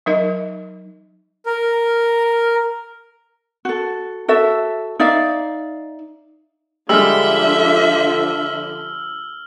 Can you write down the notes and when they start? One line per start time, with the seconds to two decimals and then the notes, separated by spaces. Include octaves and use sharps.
0.06 F#3 D#4 A#4 D#5 E5
1.46 A#4
3.65 F#4 A4
4.28 F#4 A4 E5
5.00 D#4 D5 E5 F5
6.89 D3 F3 G3 G#3 E5 E6 F6